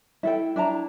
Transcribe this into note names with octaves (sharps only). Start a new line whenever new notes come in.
E4 A4 G5
D4 E4 A5 A#5